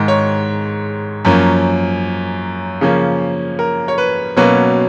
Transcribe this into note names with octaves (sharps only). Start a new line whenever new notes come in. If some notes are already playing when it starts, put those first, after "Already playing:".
Already playing: G#2 D#3 G#3
C#5
F#2 F3 A#3 C#4
C#3 F3 A#3 C#4
A#4
C#5
B4
B2 F#3 A#3 C#4 B4